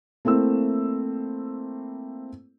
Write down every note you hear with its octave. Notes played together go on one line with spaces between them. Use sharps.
A3 A#3 C4 E4 E6